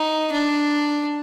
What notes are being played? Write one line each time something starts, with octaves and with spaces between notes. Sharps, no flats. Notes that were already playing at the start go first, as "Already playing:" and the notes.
Already playing: D#4
D4